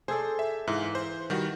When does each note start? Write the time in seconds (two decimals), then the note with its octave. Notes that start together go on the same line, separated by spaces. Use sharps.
0.08 G#4 A4 C5 D5
0.39 E5
0.67 G#2 E3 F5
0.95 C5
1.30 D#3 G3 F#4